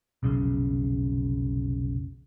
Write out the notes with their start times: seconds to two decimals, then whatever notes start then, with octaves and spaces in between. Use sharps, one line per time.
0.23 F1 B1 C#3